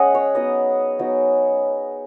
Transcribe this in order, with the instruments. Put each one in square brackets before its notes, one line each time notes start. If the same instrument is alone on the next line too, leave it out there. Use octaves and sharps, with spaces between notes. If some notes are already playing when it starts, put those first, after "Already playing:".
Already playing: [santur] G#3 C#4 G#4 D#5 F#5
C#5
F#3 B3 D#4 D#5
F#3 B3 D#4